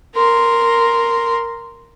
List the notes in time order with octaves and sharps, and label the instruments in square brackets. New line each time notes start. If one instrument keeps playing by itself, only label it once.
[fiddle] A#4 C6